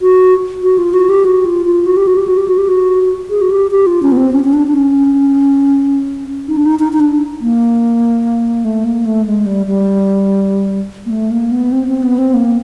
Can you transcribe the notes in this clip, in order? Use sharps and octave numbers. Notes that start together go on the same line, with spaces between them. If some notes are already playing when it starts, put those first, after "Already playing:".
F#4
F#4
F4
F#4
G4
F#4
F4
F4
F#4
G4
F#4
G4
F#4
G4
F#4
G4
F#4
G#4
F#4
G4
G4
F4
C#4
B3
C4
C#4
C#4
D4
D4
C#4
D#4
D4
D#4
D#4
D#4
D4
A#3
A3
A#3
A3
G#3
G3
G3
A#3
A3
A#3
B3
C4
C4
B3
C4
A#3